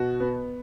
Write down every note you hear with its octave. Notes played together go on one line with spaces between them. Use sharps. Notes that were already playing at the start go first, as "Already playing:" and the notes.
Already playing: B2 F#4
B3